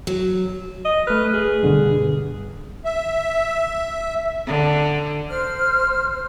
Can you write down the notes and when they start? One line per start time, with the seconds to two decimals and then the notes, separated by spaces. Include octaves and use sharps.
0.07 F#3
0.85 D#5
1.07 A3 B4 F6
1.34 G#4
1.63 G2 B2 D3
2.85 E5
4.47 D3
5.30 C5 F6